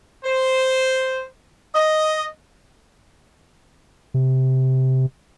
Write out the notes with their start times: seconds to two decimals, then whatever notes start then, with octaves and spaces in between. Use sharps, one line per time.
0.25 C5
1.74 D#5
4.14 C3